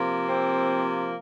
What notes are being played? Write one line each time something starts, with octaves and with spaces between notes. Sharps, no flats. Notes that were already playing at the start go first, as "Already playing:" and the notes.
Already playing: C3 F3 A#3
C4